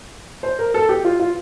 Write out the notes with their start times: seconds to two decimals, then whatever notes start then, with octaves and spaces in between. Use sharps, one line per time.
0.43 C5
0.59 A#4
0.74 A4
0.89 G4
1.04 F4
1.20 F4